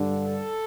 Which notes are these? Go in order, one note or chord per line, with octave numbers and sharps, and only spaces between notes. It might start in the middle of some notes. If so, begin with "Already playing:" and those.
Already playing: G2 D3
A4